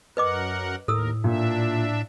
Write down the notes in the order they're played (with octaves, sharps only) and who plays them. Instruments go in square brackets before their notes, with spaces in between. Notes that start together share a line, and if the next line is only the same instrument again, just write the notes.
[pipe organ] F#2 A#4 F#5 [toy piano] B4 D#5 D6
[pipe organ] D#2 A#4 [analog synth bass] A2 [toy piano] A4 E6
[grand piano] A#2 [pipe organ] D4 E5